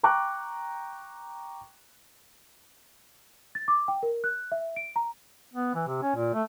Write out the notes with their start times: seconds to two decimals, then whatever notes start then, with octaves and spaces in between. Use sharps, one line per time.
0.03 G5 A#5 C#6 D6 F#6
3.55 A6
3.68 D6
3.88 G5
4.03 A#4
4.24 F#6
4.52 E5
4.76 D7
4.96 A#5
5.54 B3
5.74 E3
5.87 C3
6.02 C#4
6.16 A#2
6.34 A3